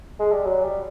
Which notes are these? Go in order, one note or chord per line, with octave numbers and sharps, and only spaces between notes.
G#3
G3
F#3
G3